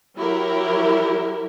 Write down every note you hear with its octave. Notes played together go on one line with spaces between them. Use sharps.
F#3 E4 G4 A#4